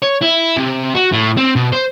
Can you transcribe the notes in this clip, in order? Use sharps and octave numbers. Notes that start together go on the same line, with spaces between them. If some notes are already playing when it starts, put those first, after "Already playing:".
C#5
E4
C3
F#4
A2
C4
B2
C5